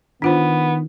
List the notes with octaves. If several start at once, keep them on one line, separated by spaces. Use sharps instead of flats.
D#3 B3 D4 F4 C5